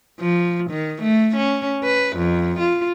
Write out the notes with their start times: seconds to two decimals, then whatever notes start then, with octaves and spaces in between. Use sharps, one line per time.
0.20 F3
0.70 D#3
1.02 A3
1.36 C#4
1.83 B4
2.16 F2
2.60 F4